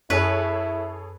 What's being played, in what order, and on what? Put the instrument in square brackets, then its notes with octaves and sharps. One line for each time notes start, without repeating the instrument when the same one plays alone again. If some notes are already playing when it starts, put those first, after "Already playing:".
[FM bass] F#2 [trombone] E4 [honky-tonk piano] G#4 A4 C#5 [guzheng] B4